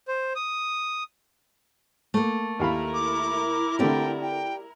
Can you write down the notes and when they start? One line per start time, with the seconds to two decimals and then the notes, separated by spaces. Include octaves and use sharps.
0.08 C5
0.36 D#6
2.14 A3 A#3
2.59 D#2 E4 A#4 F5 B5
2.94 D6
3.79 D3 A3 C4 G4 D5 G5
4.22 G5